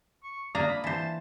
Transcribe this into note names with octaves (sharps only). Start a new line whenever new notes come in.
C#6
A#3 D4 A#5 D#6
B5
E3 C5 A5